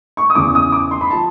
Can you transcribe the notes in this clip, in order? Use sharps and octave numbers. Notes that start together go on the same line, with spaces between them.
C#6
D#6
E2 C#3 E3 D6
D#6
D6
C6
B5
F3 A5